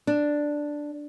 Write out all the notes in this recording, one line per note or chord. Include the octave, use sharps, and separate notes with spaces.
D4